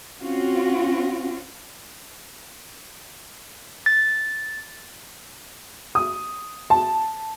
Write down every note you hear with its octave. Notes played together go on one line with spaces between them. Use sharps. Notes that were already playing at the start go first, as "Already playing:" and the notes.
C4 C#4 F4 F#4
A6
D#6
A5